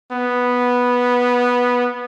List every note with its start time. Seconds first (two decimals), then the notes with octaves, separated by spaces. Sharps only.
0.12 B3